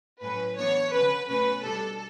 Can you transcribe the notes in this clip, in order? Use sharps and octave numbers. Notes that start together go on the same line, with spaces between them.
A2 F#3 C#4 B4
E3 B3 D4 C#5
D3 F#3 C#4 B4
B2 A3 C#4 B4
B2 G3 D4 A4